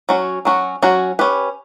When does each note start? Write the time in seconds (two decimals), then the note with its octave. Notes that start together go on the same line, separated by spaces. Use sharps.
0.09 F#3 C#4 F#4
0.45 F#3 C#4 F#4
0.82 F#3 C#4 F#4
1.19 C#4 G4 B4